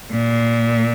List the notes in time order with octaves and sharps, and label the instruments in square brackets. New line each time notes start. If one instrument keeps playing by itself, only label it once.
[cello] A#2